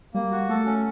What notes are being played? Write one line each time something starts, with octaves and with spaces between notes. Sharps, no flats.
G3 A#3
F#4
A3 A4
C#4